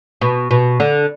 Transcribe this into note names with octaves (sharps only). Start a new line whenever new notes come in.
B2
B2
D3